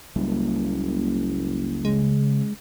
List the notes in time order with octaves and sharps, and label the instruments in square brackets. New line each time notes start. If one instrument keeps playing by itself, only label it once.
[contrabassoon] F#1 [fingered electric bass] C#2 G3 A#3
[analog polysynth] C#3 [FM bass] G#3